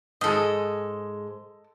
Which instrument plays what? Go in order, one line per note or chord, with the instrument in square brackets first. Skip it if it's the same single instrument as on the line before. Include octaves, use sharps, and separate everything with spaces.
[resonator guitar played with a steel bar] G#2 G#3 [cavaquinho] A4 D#5